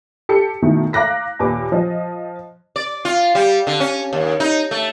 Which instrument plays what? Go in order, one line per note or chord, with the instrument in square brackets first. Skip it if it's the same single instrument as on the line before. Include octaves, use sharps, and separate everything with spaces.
[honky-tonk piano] G4 A4 C#7
B2 D#3 E3 A3
F5 A#5 D6 F#6 A#6 B6
D#2 A#2 B4 D6
F3 D#5
[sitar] D5
F4
G3
D3
C#4
D#2
D#4
A3